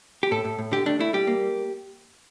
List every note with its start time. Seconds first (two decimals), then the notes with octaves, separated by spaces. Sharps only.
0.23 G4
0.31 A2 A4
0.45 A2
0.59 A2
0.72 D3 G4
0.86 A3 D4
0.99 A3 E4
1.13 G3 G4
1.27 A#3